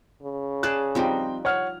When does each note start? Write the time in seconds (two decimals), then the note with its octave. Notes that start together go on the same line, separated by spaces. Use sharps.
0.23 C#3
0.63 G#4 D5 A5 F#6
0.95 F3 G3 C4 D#4 G5
1.45 C#5 F#5 F6